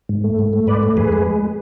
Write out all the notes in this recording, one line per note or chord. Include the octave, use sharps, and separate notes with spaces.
G#2
A3
G#2
A3
G#2 B4 D5
A3
F2 G#4 B4
G#3
G#3